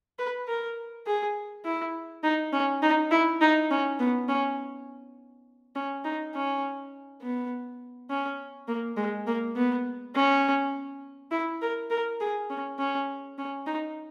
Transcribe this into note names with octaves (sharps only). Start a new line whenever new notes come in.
B4
A#4
G#4
E4
D#4
C#4
D#4
E4
D#4
C#4
B3
C#4
C#4
D#4
C#4
B3
C#4
A#3
G#3
A#3
B3
C#4
E4
A#4
A#4
G#4
C#4
C#4
C#4
D#4